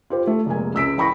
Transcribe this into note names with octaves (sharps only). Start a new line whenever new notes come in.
F4 G4 C5
A3
F1 G#3 A#3 G#5
C#2 E6 B6 D7
E3 G5 B5 C#6 A#6